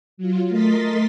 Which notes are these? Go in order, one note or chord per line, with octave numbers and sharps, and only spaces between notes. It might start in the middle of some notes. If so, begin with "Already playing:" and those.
F#3 F4
A3 A#4 D#5 C6 A6 B6